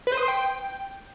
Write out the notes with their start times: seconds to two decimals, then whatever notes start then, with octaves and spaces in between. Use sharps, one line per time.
0.07 B4
0.12 C5
0.18 D#6
0.23 C6
0.28 G5